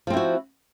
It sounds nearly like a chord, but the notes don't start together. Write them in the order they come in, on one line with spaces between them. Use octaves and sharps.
F3 C4 E4 F#4